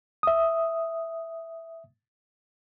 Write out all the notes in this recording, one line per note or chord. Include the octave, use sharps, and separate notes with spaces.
E5 D#6